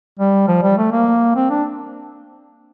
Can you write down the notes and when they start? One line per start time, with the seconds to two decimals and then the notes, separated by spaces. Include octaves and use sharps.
0.19 G3
0.48 F3
0.62 G3
0.78 A3
0.92 A#3
1.35 C4
1.50 D4